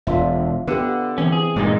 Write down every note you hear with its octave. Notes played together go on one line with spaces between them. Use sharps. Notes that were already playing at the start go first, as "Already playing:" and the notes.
E1 D4 F4 E5
D3 B3 G4
E2 E3 C4 C#4
G#4
G2 A#2 G#3 D#4